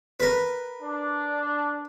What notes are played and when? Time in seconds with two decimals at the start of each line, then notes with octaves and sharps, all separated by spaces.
0.20 A#4 B4
0.82 D4